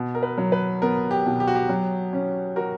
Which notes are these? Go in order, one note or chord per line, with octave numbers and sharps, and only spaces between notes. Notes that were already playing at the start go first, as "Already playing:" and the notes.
Already playing: B2
A#4
B4
F#3
B4
B3 A#4
G4
B2
G4
F#4
G4
F#3
C#4
F#4 A#4